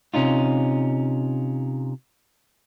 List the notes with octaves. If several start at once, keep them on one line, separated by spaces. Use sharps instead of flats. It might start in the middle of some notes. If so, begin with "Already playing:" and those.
C3 C#4 D#4 F4